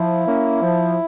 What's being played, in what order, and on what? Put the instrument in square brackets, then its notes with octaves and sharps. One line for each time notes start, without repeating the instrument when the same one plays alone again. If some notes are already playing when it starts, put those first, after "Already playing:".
Already playing: [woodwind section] F3 [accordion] E4
[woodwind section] A#3 C#4
F3